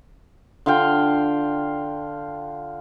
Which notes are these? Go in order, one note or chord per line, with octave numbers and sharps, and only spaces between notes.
D3 F4 F5 G5